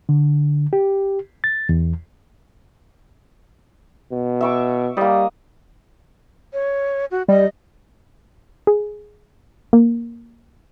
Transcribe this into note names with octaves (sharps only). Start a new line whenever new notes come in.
D3
G4
A6
E2
B2
E5 C#6 D6
G3 A#3 D#5
C#5
F#4
G3 D#5
G#4
A#3